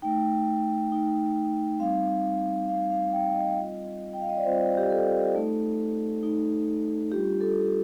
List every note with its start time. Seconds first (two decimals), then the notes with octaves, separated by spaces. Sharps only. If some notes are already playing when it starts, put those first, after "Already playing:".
0.02 A3 D#4 G5
0.92 A3 D#4
1.79 G3 C4 D#4 F5
2.68 G3 C4 D#4 F5
2.90 F5
3.13 G5
3.35 D#5
3.57 G3 C4 F4
4.13 G5
4.21 F5
4.29 D#5
4.37 D5
4.45 G3 C4 F4 C5
4.77 G4
4.90 A4
5.34 A3 D#4
6.23 A3 D#4
7.11 G3 D4 F4 G4
7.41 A4